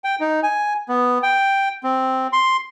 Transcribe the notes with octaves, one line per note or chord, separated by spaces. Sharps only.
G5
D#4
G#5
B3
G5
C4
C6